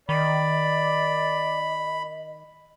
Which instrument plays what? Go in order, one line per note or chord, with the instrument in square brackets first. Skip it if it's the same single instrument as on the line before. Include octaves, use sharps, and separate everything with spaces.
[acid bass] D#3 [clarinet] D5 [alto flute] D#5 [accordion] B5